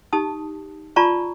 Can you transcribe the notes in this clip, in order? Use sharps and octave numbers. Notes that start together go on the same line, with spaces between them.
D#4 G4 A5 D#6
F4 D5 A5 A#5 C#6